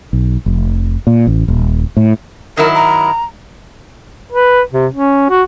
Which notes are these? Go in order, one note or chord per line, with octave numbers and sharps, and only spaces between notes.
B1
F1
A#2
A1
D#1
A2
D#3 F#3 E4 A#4
A#5
B4
C3
C#4
F#4